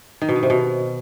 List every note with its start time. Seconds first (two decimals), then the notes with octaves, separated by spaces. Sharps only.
0.22 D#3
0.29 B2
0.36 D#3
0.43 C3
0.50 B2